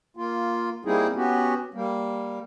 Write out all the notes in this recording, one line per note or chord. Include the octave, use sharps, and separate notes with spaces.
A#3 F4
G3 A#3 C4 D#4 E4 G#4
B3 C#4 F#4 G4
G3 A#3